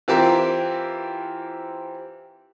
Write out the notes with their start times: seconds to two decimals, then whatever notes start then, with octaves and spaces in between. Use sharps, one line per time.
0.08 E3 C4 F4 G4 A#4